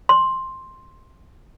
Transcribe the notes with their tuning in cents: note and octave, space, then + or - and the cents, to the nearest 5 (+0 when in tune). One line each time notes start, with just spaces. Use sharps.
C6 +10